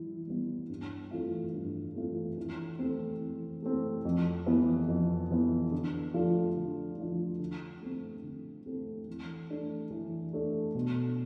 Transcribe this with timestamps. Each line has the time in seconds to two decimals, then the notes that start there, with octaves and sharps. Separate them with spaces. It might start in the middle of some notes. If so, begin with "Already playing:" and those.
Already playing: E3 G3 E4
0.27 G3 B3 E4
0.69 G2
1.11 E3 A3 C4 F4
1.53 G2
1.95 E3 A3 C4 F4
2.37 E3
2.79 A3 C4
3.21 E3
3.62 A3 C4
4.05 F2
4.46 E3 B3
4.88 F2
5.31 E3 B3
5.72 D3
6.14 F3 A3 D4 F4
6.56 D3
6.98 F3 A3 D4 F4
7.39 D3
7.81 A3 C4
8.23 D3
8.66 A3 C4
9.07 E3
9.50 A3 D4
9.91 E3
10.33 A3 D4
10.75 B2